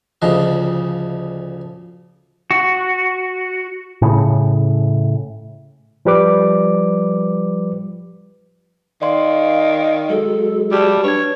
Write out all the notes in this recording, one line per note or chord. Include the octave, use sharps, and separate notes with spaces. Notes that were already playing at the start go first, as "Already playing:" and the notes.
D2 C#3 F3 D#5
F#4
A2 C#3
F3 G3 B4 D6
D#3 D5 F5 C6
F#3 G#3 A4
G3 G4 A5
D4 B4 C#5 G#6